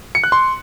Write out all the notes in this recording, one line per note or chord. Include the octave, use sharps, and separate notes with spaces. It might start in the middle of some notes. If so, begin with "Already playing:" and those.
C#7
F#6
C6